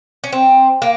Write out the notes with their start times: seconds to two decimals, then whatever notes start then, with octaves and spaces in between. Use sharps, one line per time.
0.24 C#4
0.32 C4
0.82 A#3